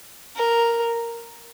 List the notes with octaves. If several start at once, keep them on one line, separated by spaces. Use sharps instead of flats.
A#4